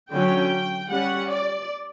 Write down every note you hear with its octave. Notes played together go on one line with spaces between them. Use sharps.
D3 F#3 C#4 G5
G3 C#4 F#5
D5